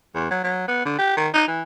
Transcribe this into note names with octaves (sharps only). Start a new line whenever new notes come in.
E2
F#3
F#3
B3
D3
G4
D#3
D#4
E3